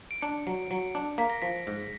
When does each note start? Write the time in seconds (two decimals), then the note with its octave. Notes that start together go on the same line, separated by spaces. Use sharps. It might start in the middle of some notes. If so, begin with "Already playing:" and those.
0.11 D7
0.22 D4 C#7
0.47 F#3
0.71 F#3
0.95 D4
1.18 A#3 B6
1.30 A#6
1.42 F3 B6
1.67 G#2